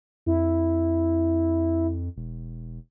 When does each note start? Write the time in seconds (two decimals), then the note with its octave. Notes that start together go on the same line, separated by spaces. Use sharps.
0.26 F2 E4
2.17 E1